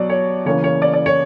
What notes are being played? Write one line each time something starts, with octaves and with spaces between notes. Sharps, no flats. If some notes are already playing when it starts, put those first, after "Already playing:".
Already playing: B2 F#3 D5
C#5
C#3 E3 A#3 C#5
C#5
D5
D5
C#5